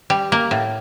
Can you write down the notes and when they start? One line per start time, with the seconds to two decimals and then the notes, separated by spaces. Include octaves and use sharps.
0.10 G3
0.32 A#3
0.51 A2